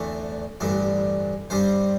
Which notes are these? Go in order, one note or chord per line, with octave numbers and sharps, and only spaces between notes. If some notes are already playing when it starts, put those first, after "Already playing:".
Already playing: E2 D3 A3 C4 E5
A1 G2 D3 C4
G2 G3 C4 C5